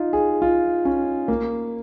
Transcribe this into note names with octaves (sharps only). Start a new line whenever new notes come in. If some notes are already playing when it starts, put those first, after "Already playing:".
Already playing: D#4 F4
G#4
F4
C#4
A#3